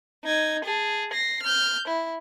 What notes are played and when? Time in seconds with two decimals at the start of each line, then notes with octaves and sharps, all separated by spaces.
0.24 D#4 G#6
0.64 G#4 A5
1.12 A#6 C7
1.42 F6 G6
1.88 E4